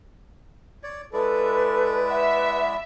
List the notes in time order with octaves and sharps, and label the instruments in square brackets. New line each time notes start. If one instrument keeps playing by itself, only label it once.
[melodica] C#5 D5
[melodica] G#3 E4 D5 [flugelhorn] A4 [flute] B4
[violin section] E5 [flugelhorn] F#5